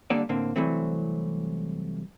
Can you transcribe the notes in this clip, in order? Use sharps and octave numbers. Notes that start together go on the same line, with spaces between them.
D3 G3 A#3 A4 D5
A2 D3 A#3 C4
C2 E3 F#3 A3 C4